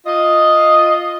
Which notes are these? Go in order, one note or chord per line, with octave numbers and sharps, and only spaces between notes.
F4 D#5